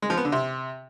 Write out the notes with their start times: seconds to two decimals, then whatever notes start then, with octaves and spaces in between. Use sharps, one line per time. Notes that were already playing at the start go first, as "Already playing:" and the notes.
0.02 G#3
0.10 F3
0.17 B3
0.25 D3
0.32 C3